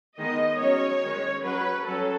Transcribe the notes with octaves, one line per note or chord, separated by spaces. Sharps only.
D#3 G#3 B3 D#5
F#3 C#4 C#5
D#3 G#3 C#4
F#3 C#4 B4
F#3 C#4 A4